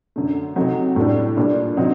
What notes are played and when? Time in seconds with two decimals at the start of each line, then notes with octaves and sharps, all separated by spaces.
0.16 F#2 D3 A3
0.56 C3 F#3 A3 D#4
0.96 A2 G3 D4
1.37 A#2 G3 D4
1.77 D3 F#3 C4 D#4